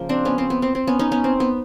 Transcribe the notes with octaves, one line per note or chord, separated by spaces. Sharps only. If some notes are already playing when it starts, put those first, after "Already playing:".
Already playing: C#3 F3 A#3
C4 D4
B3 C#4
C4
B3
C4
C4
B3 C#4
C#4 D#4
B3 C#4
C4
B3